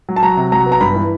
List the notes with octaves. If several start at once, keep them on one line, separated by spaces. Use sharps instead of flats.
F#3
A5
F#3 A#5
C3
F#3 A#5
B3
A#5
G2 B5
E3